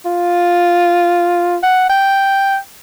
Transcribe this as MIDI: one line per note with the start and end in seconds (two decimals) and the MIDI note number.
0.05 1.57 65
1.63 1.88 78
1.90 2.57 79